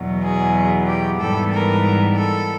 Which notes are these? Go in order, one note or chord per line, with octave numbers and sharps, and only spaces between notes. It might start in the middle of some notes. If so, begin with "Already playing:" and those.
Already playing: E2 B2 F#3
G#4
G4
G#2 E3 G3 B3 A4
A#4
A4